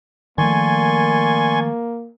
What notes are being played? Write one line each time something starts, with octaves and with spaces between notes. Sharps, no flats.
D#3 F3 A3 A#3 D5 G#5 C6 C#6